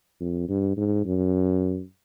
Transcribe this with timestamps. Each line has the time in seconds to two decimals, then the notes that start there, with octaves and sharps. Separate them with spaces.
0.20 F2
0.49 G2
0.77 G#2
1.05 F#2